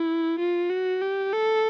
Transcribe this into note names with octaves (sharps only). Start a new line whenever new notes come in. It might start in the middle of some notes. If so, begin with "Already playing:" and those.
Already playing: E4
F4
F#4
G4
A4